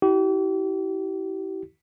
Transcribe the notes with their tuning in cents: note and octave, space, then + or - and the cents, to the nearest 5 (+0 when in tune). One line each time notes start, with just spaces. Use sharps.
E4 -20 G4 -40